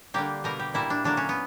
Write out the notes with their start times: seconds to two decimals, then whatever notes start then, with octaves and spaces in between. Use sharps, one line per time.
0.14 D3 G3 A#3 G4
0.44 B2 G3 A#3 A#4
0.59 G4
0.74 A#2 G3 A#3 E4
0.90 D4
1.04 D3 F#3 A#3 D4
1.17 C#4
1.29 B3